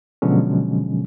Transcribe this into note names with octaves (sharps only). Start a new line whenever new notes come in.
B2 D3 F3 F#3 G#3 C#4